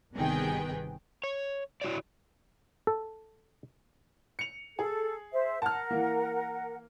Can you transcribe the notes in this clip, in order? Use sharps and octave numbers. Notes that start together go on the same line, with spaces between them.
G1 C3 D#3 B3 G#4 G5
C#5
E4 F#4 A4 C#5 D5
A4
C#7 F7
G#4 A4
C5 E5
A#4 F#5 A5 F6
E3 A#3